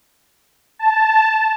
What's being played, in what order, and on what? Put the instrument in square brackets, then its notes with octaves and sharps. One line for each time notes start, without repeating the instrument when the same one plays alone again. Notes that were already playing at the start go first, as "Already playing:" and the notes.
[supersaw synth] A5